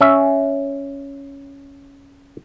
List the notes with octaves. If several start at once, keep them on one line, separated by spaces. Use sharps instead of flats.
C#4 E5